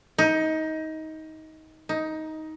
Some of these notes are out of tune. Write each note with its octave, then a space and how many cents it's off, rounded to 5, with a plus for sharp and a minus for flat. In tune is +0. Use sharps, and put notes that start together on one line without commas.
D#4 +20
D#4 +15